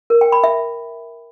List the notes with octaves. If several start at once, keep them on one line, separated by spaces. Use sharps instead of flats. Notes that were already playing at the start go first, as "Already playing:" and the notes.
A#4
G5
B5
E5